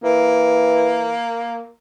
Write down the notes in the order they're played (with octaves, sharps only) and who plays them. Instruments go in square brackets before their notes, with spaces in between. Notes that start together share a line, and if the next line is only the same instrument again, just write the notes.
[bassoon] E3 [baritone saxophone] A#3